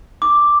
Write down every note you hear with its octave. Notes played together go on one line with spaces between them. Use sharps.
D6